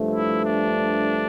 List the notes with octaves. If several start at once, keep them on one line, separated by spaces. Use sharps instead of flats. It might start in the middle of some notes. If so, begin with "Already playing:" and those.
Already playing: G2 F3 A3
E4
D4